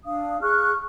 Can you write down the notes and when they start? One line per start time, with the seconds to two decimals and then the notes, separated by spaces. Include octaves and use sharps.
0.05 D4 F5 D#6
0.42 G#4 C#6 F6 F#6